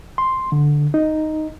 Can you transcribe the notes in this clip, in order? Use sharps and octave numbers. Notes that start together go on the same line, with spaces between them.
C6
D3
D#4